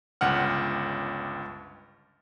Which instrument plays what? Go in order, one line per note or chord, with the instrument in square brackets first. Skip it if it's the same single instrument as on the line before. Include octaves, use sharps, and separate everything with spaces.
[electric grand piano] G1 C#2 F#5 F6